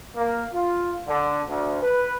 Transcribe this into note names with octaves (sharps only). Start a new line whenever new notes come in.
A#3
F4
D3
D2
B4